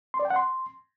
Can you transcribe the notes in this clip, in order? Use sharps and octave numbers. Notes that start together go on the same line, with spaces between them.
C6
D5
G5
F#5
C6